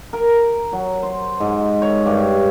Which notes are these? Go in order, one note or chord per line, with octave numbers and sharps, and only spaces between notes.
A#4
F#3
C5
G#2
C#5
G2